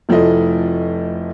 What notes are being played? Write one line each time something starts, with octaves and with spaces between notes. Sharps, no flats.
F1 F3 A3 E4 D#5